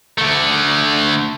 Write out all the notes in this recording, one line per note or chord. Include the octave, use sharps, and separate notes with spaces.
D3 A3